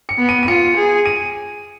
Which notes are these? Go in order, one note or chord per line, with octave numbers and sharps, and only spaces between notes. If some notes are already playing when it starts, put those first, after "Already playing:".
C#7
B3
D#7
D#7
F4 C#7
G#4
D#7